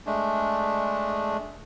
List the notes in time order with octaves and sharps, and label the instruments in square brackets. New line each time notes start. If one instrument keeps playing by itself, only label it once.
[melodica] G#3 A3 D4